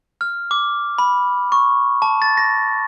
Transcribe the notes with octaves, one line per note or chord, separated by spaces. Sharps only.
F6
D6
B5
C#6
A5
A6
A#6